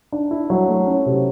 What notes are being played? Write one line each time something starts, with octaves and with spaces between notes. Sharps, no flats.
D4
E4
F#3
A3
C#4
C3